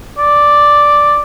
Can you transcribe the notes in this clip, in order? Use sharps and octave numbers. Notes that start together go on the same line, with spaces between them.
D5